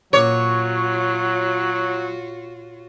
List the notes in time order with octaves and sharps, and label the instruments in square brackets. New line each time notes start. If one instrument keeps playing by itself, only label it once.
[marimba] A#2 A#3 D6 [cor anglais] F#3 [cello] F4 F#4 [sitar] C#5